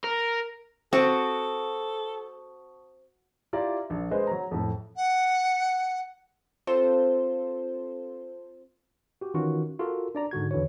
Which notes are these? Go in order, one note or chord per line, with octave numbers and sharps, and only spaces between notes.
A#4
C4 F#4 A4 A5 C#6 D#6
E4 F4 G4 D5 A#5
A#1
G#3 B4 C5 D#5
F#3 A#5
F2 A2
F#5
C4 F4 A4 C5
F#4 G4
D#3 E3 C#4 F4 F#4
F4 F#4 A4 A#4
D4 D5 A#5
G#2 D3 F#4 G#6
E2 D3 E3 F#4 C#5